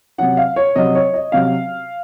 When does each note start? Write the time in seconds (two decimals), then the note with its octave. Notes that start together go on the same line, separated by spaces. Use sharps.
0.18 C3 F#3 C#4 F#5
0.37 F5
0.56 C#5
0.76 C3 F#3 C#4 D#5
0.95 C#5
1.14 D#5
1.32 C3 F#3 C#4 F5